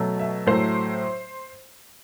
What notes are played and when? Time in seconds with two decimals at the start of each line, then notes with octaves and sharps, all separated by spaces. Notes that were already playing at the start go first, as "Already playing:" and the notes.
Already playing: B2 F#3 A3
0.19 E5
0.47 A2 F#3 A3 C5